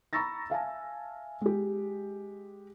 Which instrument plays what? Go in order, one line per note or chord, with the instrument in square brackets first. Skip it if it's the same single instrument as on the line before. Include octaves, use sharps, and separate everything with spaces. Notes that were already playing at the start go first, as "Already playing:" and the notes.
[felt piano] A#5 B5 C#6 E6 A6 A#6
E5 F5 G#5 A5
G#3 G4